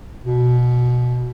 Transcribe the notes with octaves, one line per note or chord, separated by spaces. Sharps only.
B2